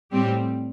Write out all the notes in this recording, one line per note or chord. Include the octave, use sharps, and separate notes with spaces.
A2 G3 C4 G4